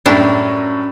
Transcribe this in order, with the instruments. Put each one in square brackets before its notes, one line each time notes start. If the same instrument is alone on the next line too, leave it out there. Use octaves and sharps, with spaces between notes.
[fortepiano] F#2 A2 [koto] G3 D4 E4